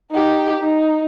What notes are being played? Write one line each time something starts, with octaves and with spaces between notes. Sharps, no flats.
D#4 G4
D#4